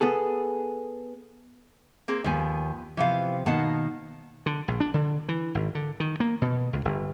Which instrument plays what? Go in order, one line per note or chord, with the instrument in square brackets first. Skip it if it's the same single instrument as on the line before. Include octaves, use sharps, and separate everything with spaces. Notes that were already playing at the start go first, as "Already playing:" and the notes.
[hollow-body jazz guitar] B3 G#4 A4
[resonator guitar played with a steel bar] A#3 C4 G#4
[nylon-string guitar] D#2 G#5 [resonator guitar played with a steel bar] F3 B3
[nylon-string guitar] C3 F3 [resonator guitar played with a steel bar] E3 B3 F5
[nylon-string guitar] B2 D#3 A#3 [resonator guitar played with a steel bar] B3 F#5 A5
[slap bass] D3
A#1
D4
D3
E3
G#1
D3
D#3
A#3
B2
C#2
G1